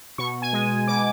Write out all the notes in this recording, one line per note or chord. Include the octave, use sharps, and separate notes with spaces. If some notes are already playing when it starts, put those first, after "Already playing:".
B2 C#6
G#5
G#3
B2 D6